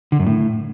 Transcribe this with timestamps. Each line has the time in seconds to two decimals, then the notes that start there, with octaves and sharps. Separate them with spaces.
0.12 D3
0.19 F#2
0.26 A2